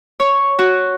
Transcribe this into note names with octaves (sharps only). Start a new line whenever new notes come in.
C#5
F#4